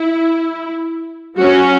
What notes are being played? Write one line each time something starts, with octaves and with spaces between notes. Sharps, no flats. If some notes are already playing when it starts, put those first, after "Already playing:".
Already playing: E4
F#3 C#4 F#4